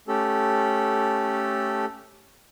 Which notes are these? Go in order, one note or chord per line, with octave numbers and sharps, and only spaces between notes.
A3 C#4 G4 A4